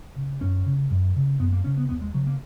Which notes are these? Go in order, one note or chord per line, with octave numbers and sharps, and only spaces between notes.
C#3
F#2 C#4
C#3
F#2
C#3
F#2 B3
A#3
C#3 C#4
B3
D#2 B3
G#3
C#3 F#3
A#3